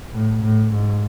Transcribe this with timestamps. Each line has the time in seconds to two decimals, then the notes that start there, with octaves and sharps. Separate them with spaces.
0.13 A2
0.42 A2
0.71 G#2